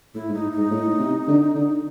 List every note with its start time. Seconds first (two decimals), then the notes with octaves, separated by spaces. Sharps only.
0.15 A2 E4
0.29 G#2
0.34 D#4
0.53 G#2 D#4
0.71 A2
0.99 C3
1.28 D3
1.55 D3